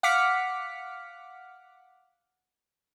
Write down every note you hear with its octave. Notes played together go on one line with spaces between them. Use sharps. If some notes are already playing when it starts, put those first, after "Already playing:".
F5 F#5 D6 F6 B6 C#7